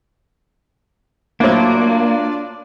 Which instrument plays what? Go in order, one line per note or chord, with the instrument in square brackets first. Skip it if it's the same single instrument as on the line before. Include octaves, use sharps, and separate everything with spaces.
[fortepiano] A2 F#3 [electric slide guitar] A#3 [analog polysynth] D4 F4 D5